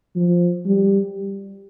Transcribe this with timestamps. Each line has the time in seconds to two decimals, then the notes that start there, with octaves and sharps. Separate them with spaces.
0.16 F3
0.66 G3